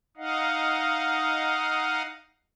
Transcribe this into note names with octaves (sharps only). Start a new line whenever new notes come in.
D#4 D#5 F5 F#5